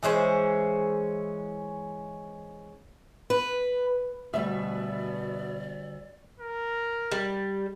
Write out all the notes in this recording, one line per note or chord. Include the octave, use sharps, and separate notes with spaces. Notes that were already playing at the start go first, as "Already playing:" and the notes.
E3 G#3 C#4 C5
B4
D2 B2 G3 D5 E5
A#4
G3